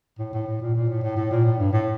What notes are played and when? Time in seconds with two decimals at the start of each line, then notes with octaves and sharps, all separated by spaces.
0.19 A2
0.33 A2
0.47 A2
0.61 A#2
0.75 A#2
0.89 A2
1.02 A2
1.16 A2
1.31 A#2
1.44 A2
1.59 G2
1.72 A2